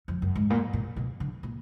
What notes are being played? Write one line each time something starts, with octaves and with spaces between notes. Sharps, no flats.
F2
F#2
G#2
A#2
A#2
B2
D3
A#2